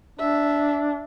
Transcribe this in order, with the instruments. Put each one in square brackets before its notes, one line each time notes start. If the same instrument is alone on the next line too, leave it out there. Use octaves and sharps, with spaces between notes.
[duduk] D4 [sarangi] E5